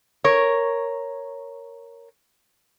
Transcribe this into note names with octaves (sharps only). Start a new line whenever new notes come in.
A#4 C#5